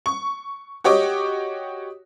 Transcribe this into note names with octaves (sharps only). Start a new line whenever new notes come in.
C#6
F#4 G4 C#5 D#5 D6